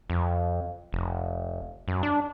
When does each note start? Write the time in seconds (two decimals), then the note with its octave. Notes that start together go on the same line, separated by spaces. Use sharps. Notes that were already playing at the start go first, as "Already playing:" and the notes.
0.10 F2
0.93 F1
1.88 F#2
2.03 D4